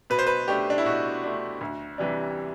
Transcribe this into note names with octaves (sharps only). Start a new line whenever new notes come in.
B2 B4
C5
B4
A3 D4 G4
D4
E4
B2 F#4
A3 D4
D2
C3 E3 G3 D4